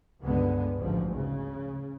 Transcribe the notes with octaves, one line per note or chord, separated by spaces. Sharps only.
C#2 G2 D3 G#3 B3
A1 D2 G#2 F3
C#3